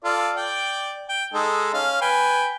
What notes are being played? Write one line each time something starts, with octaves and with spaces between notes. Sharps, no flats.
F4 A4 D5
D5 G5
G5
G#3 D#4 A4
C#4 F5
B4 G5 G#5